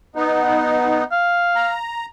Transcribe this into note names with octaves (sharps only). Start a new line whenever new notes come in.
B3 D#4
F5
A#5